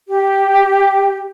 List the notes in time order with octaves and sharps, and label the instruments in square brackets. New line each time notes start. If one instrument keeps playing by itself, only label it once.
[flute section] G4